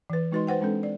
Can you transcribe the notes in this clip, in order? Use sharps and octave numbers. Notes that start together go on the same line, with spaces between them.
E3 B4
G#3 D#4 F#4 B4 D#5 C6
B4 C5 F#5 G5
G#3 C4 D4 A4
D5